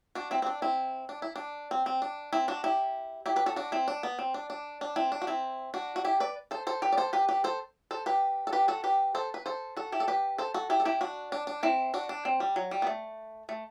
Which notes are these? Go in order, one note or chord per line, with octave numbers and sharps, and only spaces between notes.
D4 F#4
C4 E4
C4
D4
C4 E4
D4
E4
D4
C4
C4
D4
C4 E4
D4 F#4
E4 G4
E4 G4
G4 B4
F#4 A4
D4 F#4
C4 E4
D4
B3
C4
D4
D4
D4
C4 E4
D4
F#4
C4 E4
D4 F#4
F#4
E4 G4
B4 D5
A4 C5
A4 C5
G4 B4
D5
A4 C5
G4 B4
G4 B4
A4 C5
A4 C5
G4 B4
A4
G4 B4
F#4 A4
G4 B4
A4 C5
B4
A4 C5
F#4 A4
E4 G4
A4
G4 B4
A4 C5
F#4 A4
E4 G4
A4
E4 G4
D4 F#4
D4
D4
C4 E4
D4 F#4
D4
C4
G3
F#3
G3
B3
A3
A3